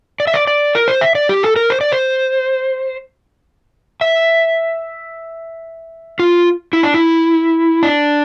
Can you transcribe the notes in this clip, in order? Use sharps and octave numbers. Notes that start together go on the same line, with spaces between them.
D5
E5
D5
D5
A#4
C5
E5
D5
G4
A4
A#4
C5
D5
C5
E5
F4
E4
D4
E4
D4